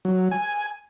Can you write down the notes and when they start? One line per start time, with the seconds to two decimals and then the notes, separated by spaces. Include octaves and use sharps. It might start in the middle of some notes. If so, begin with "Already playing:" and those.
0.05 F#3
0.31 G#5